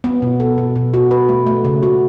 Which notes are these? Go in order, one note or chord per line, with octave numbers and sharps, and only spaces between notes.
B3
B2
A4
B2
B2
F#4
B4
A3
A3
C#3
F#4